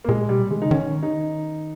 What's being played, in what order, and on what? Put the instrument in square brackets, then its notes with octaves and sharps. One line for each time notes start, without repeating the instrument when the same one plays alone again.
[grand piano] A#3
[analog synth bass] A#2 [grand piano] G#3
[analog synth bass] B2 [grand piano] G3
[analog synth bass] D#3 [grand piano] G#3
[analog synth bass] C#3 [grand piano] D#4
[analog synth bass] D#3 [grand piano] C#4
[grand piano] D#4